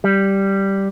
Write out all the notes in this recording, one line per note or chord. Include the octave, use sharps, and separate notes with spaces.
G3